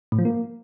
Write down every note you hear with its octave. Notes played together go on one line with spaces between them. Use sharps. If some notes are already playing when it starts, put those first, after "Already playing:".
A2
F3
A#3